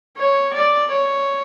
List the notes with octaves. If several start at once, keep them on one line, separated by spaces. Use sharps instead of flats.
C#5
D5
C#5